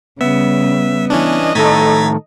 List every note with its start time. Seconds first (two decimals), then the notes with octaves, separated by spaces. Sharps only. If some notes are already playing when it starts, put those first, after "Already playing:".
0.21 C#3 G3 B3 E5
1.10 E3 C#4 D4 D#5
1.55 A2 D#3 A3 A4 A#5 G#6 A6 B6